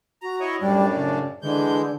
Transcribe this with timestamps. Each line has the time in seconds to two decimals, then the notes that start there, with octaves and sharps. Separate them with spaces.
0.22 F#4 A#5
0.40 E4 C#5 D#5
0.61 F#2 A2 G3 D4
0.95 C#3
1.43 D3 E3 G#3 G6